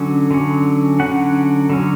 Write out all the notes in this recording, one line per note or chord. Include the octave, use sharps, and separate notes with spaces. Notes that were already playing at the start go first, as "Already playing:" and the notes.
Already playing: D3 F#3 C#4
D3 F#3 C#4
D3 F#3 C#4 F#5
D3 F#3 C#4